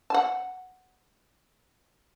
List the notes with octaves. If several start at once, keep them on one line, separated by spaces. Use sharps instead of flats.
F#5 A5